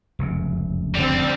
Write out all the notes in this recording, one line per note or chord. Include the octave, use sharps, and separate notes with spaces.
F1 C#2 F#2
D3 G3 C4